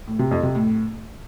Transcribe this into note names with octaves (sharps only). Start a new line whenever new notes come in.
A2
C3
F2
C3
A2